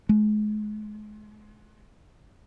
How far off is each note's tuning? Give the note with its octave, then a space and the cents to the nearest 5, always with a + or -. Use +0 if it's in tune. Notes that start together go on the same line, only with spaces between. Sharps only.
G#3 +30